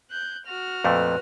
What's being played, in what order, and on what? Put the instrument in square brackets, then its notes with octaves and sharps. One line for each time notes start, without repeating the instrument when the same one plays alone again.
[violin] F#6 G6
F#4 F6
[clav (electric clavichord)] F2 A#2 A3 [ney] B4